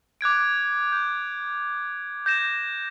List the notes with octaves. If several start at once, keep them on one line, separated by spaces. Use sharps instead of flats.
D6 F#6 G#6 D7
G6
G6 A#6 E7